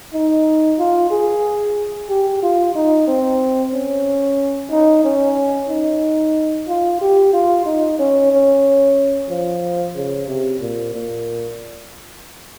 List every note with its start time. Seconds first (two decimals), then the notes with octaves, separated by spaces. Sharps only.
0.13 D#4
0.79 F4
1.11 G#4
2.09 G4
2.43 F4
2.75 D#4
3.07 C4
3.73 C#4
4.71 D#4
5.04 C#4
5.69 D#4
6.68 F4
7.01 G4
7.33 F4
7.66 D#4
7.99 C#4
8.32 C#4
9.29 F3
9.96 C#3
10.28 C3
10.60 A#2
10.94 A#2